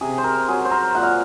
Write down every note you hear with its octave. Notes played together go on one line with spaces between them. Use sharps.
C3 G#4
C5
A#4
F#3 G#4
C5
A#4
A#2 F#5
F5